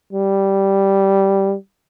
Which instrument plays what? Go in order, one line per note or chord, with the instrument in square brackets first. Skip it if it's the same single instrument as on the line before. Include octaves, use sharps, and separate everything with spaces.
[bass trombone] G3